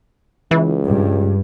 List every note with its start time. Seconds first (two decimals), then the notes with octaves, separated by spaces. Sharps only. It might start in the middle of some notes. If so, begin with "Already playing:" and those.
0.51 C#2 E3
0.87 G2